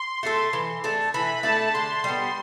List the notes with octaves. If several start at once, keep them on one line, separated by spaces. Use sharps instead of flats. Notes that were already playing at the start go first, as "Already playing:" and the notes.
Already playing: C6
A3 D4 A4
E3
A3 D4 A4
E3 B5
A3 D4 A4 A5
D3 C6
G3 B3